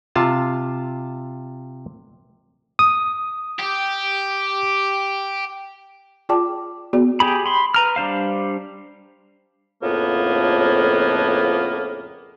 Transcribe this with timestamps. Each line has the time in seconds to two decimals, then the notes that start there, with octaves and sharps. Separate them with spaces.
0.16 C3 F4 A5
2.79 D#6
3.59 G4
6.29 F4 G#4 D5 G5 A5 D6
6.93 B3 F#4 G#4 D5
7.20 G4 G#4 B5
7.46 B5 C6
7.74 B4 A#5 F6
7.96 G3 D4 C5 F5
9.83 F2 A2 C#3 F3 A#3 B3